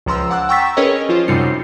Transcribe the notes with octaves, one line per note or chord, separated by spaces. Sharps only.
C#2 F3 A#5 C6 E6
F#5 A5 D6 E6 F#6
G5 A#5 C#6 E6 A6 B6
C#4 G#4 A#4 B4 C#5 D#5
F3 F4 C5
F#2 C3 G3 D#4 C7 C#7